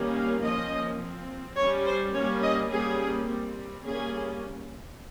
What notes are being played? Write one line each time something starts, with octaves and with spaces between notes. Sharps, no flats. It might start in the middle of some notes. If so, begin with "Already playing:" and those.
Already playing: D#3 G3 A#3 C#4
F5
F3 A#3 C#4 D#5
F3 C4
G3 C#4 C#5
C5
G3 A#3 C#4 C#5
D#5
G3 A#3 C#4 G#4
G3 C4
G3 A#3 C#4 G#4